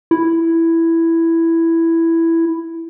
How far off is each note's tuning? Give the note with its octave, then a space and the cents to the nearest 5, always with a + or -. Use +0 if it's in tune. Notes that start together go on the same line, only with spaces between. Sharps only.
E4 +5